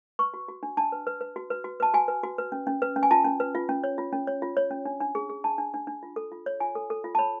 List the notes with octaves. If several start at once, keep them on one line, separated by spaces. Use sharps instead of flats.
B4 C#6
F#4
F#4
D4
D4 A5
B4
B4
B4
F#4
B4
F#4
B4 A5
F#4 G#5
B4
F#4
B4
C#4
C#4
B4
C#4
G#5
F4 A5
C#4
B4
F4
C#4
C#5
F4
C#4
C#5
F4
C#5
C#4
D4
D4
G#4
G#4
D4 A5
D4
D4
D4
F4
A4
F4
C#5
F4 G#5
A4
A4
F4
A5
C#5 B5